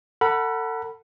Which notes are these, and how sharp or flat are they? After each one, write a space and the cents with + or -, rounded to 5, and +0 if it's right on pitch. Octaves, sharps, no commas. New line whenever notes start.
A4 +35 F#5 +5 B5 -20